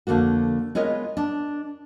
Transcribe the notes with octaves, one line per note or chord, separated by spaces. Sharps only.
F2 D3 A3 A#3 F#4
G#3 B3 F4 A#4 C#5 D#5
D4